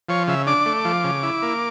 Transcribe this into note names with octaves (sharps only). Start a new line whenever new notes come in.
F3 C#5
C#3 E5
D4 D6
A3
F3
C#3
E4
A#3